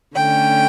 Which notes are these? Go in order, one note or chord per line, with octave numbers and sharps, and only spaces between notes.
D3 A3 C#4 G5